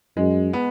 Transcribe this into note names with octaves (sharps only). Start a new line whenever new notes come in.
F#2 G#3
B3